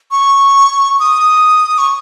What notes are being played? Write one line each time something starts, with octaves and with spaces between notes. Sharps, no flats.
C#6
D#6
C#6